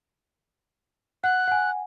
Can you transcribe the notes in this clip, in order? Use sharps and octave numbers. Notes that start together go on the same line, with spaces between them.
F#5 F#6
F#5 G#5